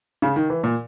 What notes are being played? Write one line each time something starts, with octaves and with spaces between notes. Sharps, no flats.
C#3
D#3
E3
A#2